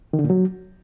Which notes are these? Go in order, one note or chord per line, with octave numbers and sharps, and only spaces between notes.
D#3
D3
A#2
F#3